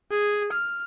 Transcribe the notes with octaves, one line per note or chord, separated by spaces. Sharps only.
G#4
F6